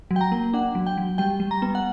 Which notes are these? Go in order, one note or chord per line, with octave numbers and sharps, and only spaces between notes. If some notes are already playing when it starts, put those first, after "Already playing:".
F#3
G5
A#5
A#3
D4 F#5
F#3
G5
F#3
G3 G5
G3
A#5
B3
F#5